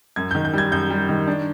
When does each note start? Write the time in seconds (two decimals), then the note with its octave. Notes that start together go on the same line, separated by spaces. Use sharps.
0.16 F#2 G#6
0.31 D#3 G6
0.45 G6
0.54 G3 G#6
0.72 F#2 G6
0.90 G3
1.09 D#3
1.27 D4